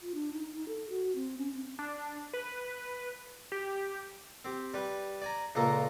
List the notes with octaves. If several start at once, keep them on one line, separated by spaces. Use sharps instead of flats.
F4
D4
D#4
D#4
A4
F#4
C4
C#4
C4
D4
B4
G4
C4 G4
G3 B4
D5 G#5 A#5
C#2 A#2 A#3 A4 A#4 A#5